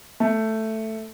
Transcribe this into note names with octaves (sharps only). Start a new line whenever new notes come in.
A3